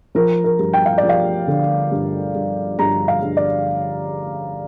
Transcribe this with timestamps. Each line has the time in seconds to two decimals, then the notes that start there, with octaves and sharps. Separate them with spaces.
0.15 F3 A#4
0.44 A#4
0.59 G2
0.73 G5
0.86 F5
0.98 D5
1.03 F3
1.09 F5
1.47 D3
1.91 G2
2.35 G2
2.79 G2 A#5
3.08 F5
3.23 G2
3.37 D5